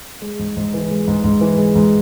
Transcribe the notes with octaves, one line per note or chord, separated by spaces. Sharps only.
G#3
G#2
G#2
E3
G#3
G#2
G#2
E3
G#3
G#2